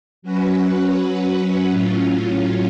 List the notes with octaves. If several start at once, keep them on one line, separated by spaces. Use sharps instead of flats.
F#3 C#4 F#4 B4
A2 F#3 C#4 F4